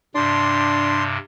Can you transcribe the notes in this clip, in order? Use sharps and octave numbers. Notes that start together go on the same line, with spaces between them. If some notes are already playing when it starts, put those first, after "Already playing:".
G2 C3 D4 C6